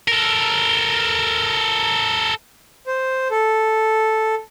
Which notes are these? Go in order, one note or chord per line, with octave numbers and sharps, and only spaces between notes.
A4 A#4
C5
A4